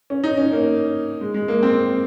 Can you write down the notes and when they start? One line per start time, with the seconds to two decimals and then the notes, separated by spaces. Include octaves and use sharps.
0.10 C#4
0.24 D#4
0.37 C#4
0.52 A#3
1.21 G#3
1.34 G#3
1.48 A#3
1.63 C4